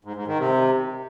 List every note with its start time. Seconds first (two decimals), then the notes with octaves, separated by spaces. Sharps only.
0.04 G#2
0.16 G#2
0.27 D#3
0.39 C3